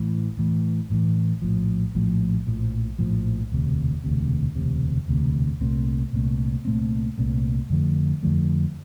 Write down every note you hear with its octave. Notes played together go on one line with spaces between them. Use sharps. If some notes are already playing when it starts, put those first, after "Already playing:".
Already playing: A1 A2 E3
A1 A2 E3
A1 A2 E3
A#1 A2 F3
A#1 A2 F3
A#1 A2 F3
A#1 A2 F3
E1 D2 C3
E1 D2 C3
E1 D2 C3
E1 D2 C3
C2 A#2 A3 C4
C2 A#2 A3 C4
C2 A#2 A3 C4
C2 A#2 A3 C4
F2 D3 F3 A3
F2 D3 F3 A3